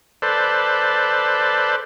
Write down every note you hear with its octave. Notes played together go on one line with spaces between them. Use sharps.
A4 B4 C5 D5